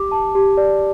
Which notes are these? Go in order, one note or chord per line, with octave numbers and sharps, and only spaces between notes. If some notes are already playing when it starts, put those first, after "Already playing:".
Already playing: G4 D6
A5
G4
D5